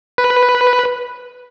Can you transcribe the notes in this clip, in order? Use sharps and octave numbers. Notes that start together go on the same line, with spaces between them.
B4